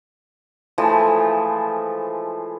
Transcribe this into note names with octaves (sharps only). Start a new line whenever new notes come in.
E3 F3 G#3 A3